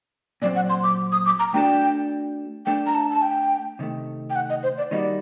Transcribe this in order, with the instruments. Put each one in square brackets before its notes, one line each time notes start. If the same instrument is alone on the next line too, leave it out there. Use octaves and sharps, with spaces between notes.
[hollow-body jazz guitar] A#2 F#3 C4 [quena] D5
[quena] F#5
C6
D6
D#6
D6
A#5
[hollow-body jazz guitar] A3 D4 F#4 A4 D5 [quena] G5
[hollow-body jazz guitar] A3 D4 A4 [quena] G5
[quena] A#5
A5
A5
G5
[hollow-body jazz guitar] C3 D#3 A3
[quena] G5
F#5
D#5
C5
D5
[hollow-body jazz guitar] D#3 G3 A#3 D#4 F#4 [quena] D#5
[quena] D5